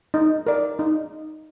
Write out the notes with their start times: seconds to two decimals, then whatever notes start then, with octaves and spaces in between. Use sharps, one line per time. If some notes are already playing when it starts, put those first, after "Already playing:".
0.14 D#4
0.47 A#4 D5
0.79 D#4